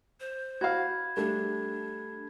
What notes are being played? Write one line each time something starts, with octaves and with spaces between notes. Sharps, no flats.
C5
F#4 F5 B5 G#6
G3 A3 D4